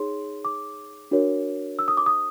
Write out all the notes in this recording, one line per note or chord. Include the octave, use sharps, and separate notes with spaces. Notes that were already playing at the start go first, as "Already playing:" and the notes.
Already playing: D#4 G#4 C#5 C6
D6
D4 F#4 A#4 C#5
E6
D#6
D6
D#6